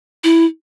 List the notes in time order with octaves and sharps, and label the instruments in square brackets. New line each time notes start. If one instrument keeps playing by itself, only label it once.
[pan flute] E4